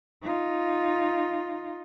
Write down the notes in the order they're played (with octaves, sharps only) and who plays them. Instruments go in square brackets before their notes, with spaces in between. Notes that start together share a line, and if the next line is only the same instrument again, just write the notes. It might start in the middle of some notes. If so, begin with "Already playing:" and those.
[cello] D#4 F4